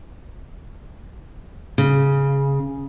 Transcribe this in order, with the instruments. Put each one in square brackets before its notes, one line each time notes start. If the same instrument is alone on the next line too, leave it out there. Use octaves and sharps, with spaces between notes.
[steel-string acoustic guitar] C#3